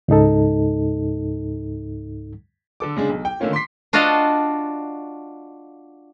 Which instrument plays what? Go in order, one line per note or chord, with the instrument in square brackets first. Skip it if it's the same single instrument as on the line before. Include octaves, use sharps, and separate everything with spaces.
[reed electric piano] C#2 G#2 D#4 A4
[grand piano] D3 A4 D6
C#3 G#3 D4
B1
G5
D3 D#3 A3 A#3 C#4 F4
C6 D6 B6 C7
[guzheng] D4 F4 F#4 D#5 F5 A5